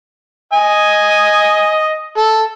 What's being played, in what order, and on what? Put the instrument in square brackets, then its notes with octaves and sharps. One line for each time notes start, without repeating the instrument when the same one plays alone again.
[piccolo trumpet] D#5 [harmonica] G#5
[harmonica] A4